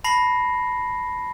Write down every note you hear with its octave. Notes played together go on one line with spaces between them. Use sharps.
A5 B5 A#6 C7 F#7